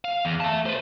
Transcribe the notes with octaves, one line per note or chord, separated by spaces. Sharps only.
F5
E2
E5 A5
B4 C5